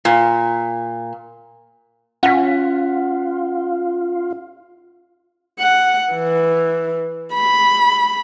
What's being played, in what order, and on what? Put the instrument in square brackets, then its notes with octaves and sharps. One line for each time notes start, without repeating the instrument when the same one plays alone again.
[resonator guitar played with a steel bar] A#2
[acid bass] C#4 [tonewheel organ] F4 [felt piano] F#5 B6
[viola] F#5
E3
B5